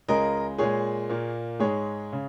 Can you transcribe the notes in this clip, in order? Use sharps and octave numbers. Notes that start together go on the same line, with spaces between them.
C#2 C#3 G#3 A#4 D#5
A#2 G#3 G#4 C#5
A#2 A#3
G#2 G#3 G#4 C#5
C#3